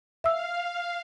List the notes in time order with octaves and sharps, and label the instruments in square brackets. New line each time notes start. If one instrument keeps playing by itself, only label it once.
[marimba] E5 E6 [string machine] F5